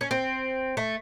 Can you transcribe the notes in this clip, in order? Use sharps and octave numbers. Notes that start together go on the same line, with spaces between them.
C#4
C4
A3